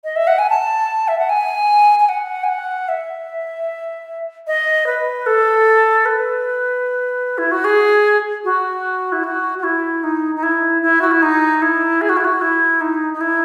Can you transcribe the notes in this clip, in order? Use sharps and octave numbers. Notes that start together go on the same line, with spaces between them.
D#5
E5
F#5
G#5
A5
E5
F#5
G#5
G#5
F#5
G#5
F#5
E5
D#5
B4
A4
B4
E4
F#4
G#4
F#4
E4
F#4
F#4
E4
D#4
D#4
E4
E4
F#4
E4
D#4
E4
G#4
F#4
E4
F#4
E4
D#4
D#4
E4